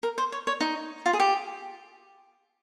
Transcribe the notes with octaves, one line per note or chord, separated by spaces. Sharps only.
A#4
C5
C#5
C#5
D#4
F4
G#4
G4